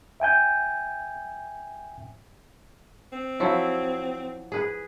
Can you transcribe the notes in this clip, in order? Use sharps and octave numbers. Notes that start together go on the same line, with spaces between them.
E5 G5 G#5 G6
C4
F3 F#3 E4
G#4 B4